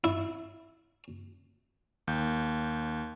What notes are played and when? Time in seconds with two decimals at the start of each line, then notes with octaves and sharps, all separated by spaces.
0.04 E4
2.07 D#2 G6